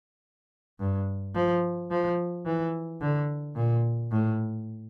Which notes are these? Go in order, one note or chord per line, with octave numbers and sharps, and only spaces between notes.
G2
F3
F3
E3
D3
A#2
A2